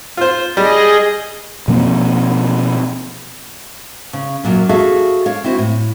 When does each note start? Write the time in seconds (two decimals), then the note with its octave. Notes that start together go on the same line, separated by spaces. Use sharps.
0.17 F4 C5
0.57 G3 G#4 D#5
1.68 B2 F3 A#3 C4
4.13 C#3
4.44 F#2 A#2 F#3 A#3 C#4
4.69 F#4 G#4 A4 E5 F5
5.26 D4 C#5 F5
5.44 C4 E4 F#4 C5
5.58 A2